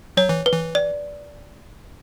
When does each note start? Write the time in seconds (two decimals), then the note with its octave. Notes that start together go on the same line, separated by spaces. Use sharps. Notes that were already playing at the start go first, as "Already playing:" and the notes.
0.17 F#3 C#5
0.29 E3
0.46 B4
0.53 E3
0.75 D5